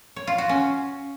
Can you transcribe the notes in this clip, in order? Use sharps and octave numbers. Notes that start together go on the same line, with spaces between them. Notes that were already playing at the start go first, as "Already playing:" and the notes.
C#5
F4
F#4
C#4